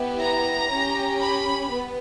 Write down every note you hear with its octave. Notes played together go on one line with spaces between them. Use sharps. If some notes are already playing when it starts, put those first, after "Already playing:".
Already playing: B3 E4 G4
A#5
C#4
G4
B5
B3